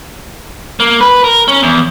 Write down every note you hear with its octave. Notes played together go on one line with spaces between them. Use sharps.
A#3
B4
A#4
C#4
E2